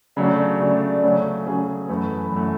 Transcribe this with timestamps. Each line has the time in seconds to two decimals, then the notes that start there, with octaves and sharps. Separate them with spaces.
0.17 C#3 F#3 A3 D4 D5
0.60 C#3 F#3 A3 D4 D5
1.03 C#3 F#3 A3 C#4 G#4
1.46 C#3 F#3 A3 C#4 G#4
1.89 F#2 E3 A3 B4
2.32 F#2 E3 A3